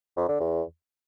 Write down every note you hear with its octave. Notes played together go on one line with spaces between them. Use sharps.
F2
D3
E2